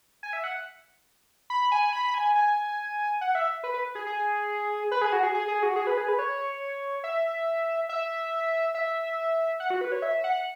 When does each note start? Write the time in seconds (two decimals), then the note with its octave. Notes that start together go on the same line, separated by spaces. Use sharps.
0.23 G#5
0.33 E5
0.44 F#5
1.50 B5
1.72 G#5
1.93 B5
2.14 G#5
2.35 G#5
3.21 F#5
3.35 E5
3.64 B4
3.74 B4
3.95 G#4
4.07 G#4
4.91 B4
5.02 G#4
5.12 F#4
5.23 G#4
5.34 G#4
5.48 G#4
5.63 F#4
5.76 G#4
5.87 B4
5.97 G#4
6.08 B4
6.19 C#5
7.04 E5
7.89 E5
8.75 E5
9.60 F#5
9.70 F#4
9.81 B4
9.92 C#5
10.02 E5
10.24 F#5